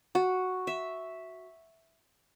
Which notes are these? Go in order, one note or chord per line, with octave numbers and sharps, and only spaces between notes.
F#4
E5